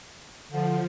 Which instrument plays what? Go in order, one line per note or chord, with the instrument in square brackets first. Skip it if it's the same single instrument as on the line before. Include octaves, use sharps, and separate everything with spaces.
[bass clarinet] D3 [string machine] F3